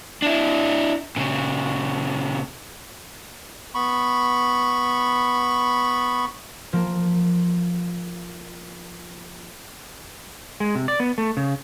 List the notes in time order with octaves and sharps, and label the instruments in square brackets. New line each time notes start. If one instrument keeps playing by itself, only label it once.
[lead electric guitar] D4 E4
A#2 C#3
[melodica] B3 B5 C#6
[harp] F3 A#3
[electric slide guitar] G#3
C3
D5
B3
A3
C#3